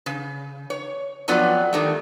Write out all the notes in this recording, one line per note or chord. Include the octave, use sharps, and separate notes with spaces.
C#3
C#5
F2 F#3 B3 F4 D5
D#3 G3 A3